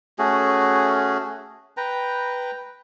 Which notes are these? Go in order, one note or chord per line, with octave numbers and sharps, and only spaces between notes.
A3 C#4 F#4 G#4
B4 G5 A#5